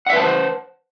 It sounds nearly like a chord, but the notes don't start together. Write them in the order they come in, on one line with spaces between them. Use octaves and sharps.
F#5 E5 B4 A5 C5